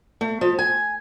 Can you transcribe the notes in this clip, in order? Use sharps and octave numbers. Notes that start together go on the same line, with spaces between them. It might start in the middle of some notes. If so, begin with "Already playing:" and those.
A3
F3
G#5